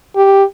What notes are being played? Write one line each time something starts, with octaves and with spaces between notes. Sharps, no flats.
G4